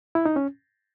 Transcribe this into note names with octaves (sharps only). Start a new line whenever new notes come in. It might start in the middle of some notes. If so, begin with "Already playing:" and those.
E4
D#4
C#4